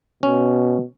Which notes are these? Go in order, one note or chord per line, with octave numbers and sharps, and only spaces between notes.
B2 C#4